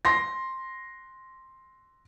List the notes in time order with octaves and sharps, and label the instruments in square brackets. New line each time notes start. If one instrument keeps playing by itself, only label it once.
[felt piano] C6 A#6